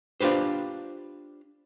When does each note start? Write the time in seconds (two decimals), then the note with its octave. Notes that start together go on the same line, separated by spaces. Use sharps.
0.21 D4 F4 G4 B4 C5